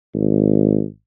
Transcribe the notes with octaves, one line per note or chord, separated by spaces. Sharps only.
G#1